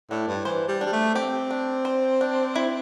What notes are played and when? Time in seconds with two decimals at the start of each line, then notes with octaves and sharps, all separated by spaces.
0.10 A2 D4
0.28 G2
0.45 E3 C5
0.68 G3
0.81 D4
0.86 G3
0.92 A3
1.15 C4 G4
1.51 D4
1.85 C5
2.21 D4
2.56 E4